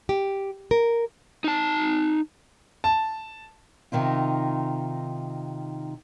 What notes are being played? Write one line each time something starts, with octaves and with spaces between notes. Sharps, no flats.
G4
A#4
D#4 A5
A5
C3 D#3 D#4 F4